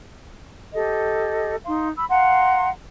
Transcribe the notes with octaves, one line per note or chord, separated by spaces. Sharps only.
G4 A4 D#5
D#4 F5 C6
B5 E6
F5 F#5 A#5 C6